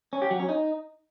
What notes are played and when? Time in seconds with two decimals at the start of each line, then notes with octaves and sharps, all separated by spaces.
0.13 C#4
0.22 G4
0.31 F#3
0.40 C#4
0.49 D#4